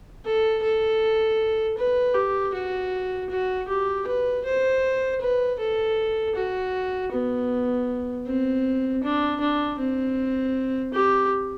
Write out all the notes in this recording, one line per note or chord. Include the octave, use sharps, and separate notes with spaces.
A4
A4
B4
G4
F#4
F#4
G4
B4
C5
B4
A4
F#4
B3
C4
D4
D4
C4
G4